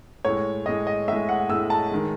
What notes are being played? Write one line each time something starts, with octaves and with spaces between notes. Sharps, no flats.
A2 G#3 C#5
A2 G#3 D#5
D#5
A2 G#3 E5
F#5
A2 G#3 E6
A5
D#3 G#3